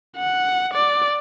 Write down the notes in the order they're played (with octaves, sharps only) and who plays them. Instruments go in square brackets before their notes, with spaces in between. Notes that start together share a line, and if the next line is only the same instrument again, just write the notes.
[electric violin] F#5
D5